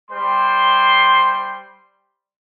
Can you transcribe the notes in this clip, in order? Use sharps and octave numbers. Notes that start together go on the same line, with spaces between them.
G3 C5 C6